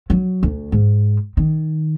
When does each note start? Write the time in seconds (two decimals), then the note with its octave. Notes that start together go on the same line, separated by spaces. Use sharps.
0.10 F#3
0.43 D2
0.72 G#2
1.37 D#3